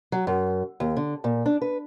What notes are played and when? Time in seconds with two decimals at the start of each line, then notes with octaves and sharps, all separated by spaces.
0.12 F#3
0.27 F#2
0.80 D#2
0.96 D3
1.24 A#2
1.46 D4
1.61 B4